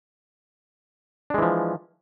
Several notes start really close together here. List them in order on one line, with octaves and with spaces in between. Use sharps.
D4 G#3 E3 F3